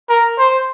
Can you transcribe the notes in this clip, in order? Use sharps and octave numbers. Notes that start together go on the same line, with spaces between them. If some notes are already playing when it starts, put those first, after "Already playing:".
A#4
C5